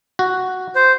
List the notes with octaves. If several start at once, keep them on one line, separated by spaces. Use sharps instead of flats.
F#4
C5